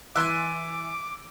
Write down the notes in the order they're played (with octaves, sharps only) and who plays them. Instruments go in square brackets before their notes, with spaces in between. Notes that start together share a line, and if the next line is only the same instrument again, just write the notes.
[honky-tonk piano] E3 [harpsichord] E5 A5 [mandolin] G#5 C6 F#6 [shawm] D6